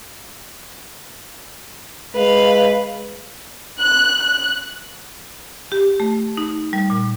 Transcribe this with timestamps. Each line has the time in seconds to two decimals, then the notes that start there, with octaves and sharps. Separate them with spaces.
2.15 G#3 B4 F5
3.80 F#6
4.21 F#6
5.72 G4
6.00 A3
6.37 D#4
6.73 G3
6.90 A#2